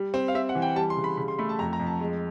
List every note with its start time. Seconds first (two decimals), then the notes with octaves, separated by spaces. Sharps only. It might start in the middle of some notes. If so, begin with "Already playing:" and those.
Already playing: G3
0.14 C4
0.28 F5
0.35 C4 E5
0.49 F#5
0.55 E3
0.62 G5
0.76 G3 A5
0.90 C6
0.96 C#3
1.04 B5
1.17 C#3 B5
1.28 C6
1.39 A3 B5
1.49 A5
1.59 F2 A#5
1.73 A#5
1.80 F2
1.87 A5
2.00 G#3